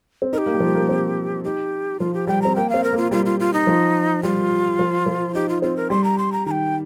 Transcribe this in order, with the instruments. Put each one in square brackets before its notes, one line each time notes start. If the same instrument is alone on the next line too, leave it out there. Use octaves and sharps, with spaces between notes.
[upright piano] C4
[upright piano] D#4 [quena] A#4
[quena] G4
[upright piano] A#3
G3
F3
A#3
C4
[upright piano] D#4 [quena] G4
[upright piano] F3 [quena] F4
[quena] G4
[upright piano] G3 [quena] G5
[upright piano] C4 [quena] A#5
[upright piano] A#3 [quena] G5
[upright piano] C4 [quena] F5
[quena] A#4
[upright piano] A#3 [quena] F4
[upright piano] G3 [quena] F4
[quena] F4
F4
D#4
[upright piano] F3
[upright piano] G3 [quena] F4
[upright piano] F3
F3
[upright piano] D#4 [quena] G4
[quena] F4
[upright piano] C4 [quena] F4
[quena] A#4
[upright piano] G3 [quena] C6
[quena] A#5
C6
A#5
[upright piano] D#3 [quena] G5 A#5